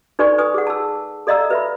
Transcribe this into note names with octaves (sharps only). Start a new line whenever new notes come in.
D#4 A4 B4 D5 G#5 C#6
B4 G#5 D#6
G#4 F#5
A5 E6
A4 D5 D#5 F5 A#5 E6
B4 E5 B5